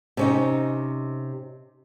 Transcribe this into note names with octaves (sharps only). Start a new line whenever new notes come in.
C3 C#4 D#4